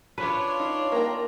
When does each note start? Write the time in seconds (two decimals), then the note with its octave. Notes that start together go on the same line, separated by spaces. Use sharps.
0.18 D4 F4 B4 C#5
0.60 D#4
0.92 A#3 G5 A#5